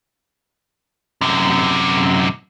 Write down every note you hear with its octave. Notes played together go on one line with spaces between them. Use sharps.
F#2 C3